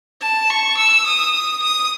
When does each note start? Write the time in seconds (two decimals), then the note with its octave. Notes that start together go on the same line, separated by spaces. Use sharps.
0.21 A5
0.50 C#6
0.78 E6
1.06 D#6
1.63 D#6